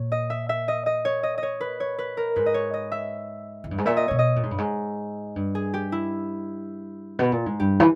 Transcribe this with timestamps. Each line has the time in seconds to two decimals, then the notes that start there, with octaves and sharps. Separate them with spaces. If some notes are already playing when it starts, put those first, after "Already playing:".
Already playing: A#2 C#5
0.12 D#5
0.30 E5
0.49 E5
0.68 D#5
0.86 D#5
1.05 C#5
1.23 D#5
1.38 D#5
1.43 C#5
1.61 B4
1.80 C#5
1.99 B4
2.17 A#4
2.36 G#2 B4
2.46 D#5
2.54 C#5
2.74 D#5
2.92 E5
3.64 E2
3.71 G2
3.78 G#2
3.85 A#2 E5
3.97 D#5
4.08 B2 C#5
4.19 D#5
4.36 A#2
4.43 G#2
4.51 G2
4.58 G#2
5.36 G2
5.55 G#4
5.74 G4
5.92 E4
7.19 B2
7.32 A#2
7.46 G#2
7.60 G2 G4
7.80 E3